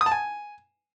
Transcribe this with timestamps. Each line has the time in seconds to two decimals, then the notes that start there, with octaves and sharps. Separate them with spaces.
0.01 D#6
0.06 A5
0.11 G#5